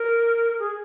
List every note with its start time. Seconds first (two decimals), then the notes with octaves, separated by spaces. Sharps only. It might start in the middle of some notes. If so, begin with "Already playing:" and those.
Already playing: A#4
0.59 G#4